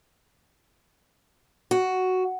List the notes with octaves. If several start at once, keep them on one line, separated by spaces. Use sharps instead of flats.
F#4